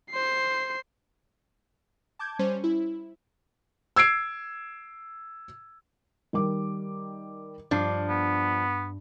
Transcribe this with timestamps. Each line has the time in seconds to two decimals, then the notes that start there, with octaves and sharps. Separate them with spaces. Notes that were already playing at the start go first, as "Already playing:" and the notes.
0.10 C5 C7
2.19 A5 D6 G6 G#6
2.39 G3 C#4 C5
2.64 E4
3.96 E6 G#6 C7 D7
6.33 D#3 G3 D6
7.71 G2 F3 D4
8.09 B3